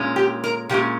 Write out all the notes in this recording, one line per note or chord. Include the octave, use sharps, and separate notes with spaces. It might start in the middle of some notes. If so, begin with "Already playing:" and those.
Already playing: A#2 G#3 C#4
G4
A#4
A#2 G#3 C#4 G4